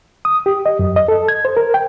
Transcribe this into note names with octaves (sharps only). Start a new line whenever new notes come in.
D#6
G4
D#5
F#2
D#5
A4
G#6
C5
A#4
G5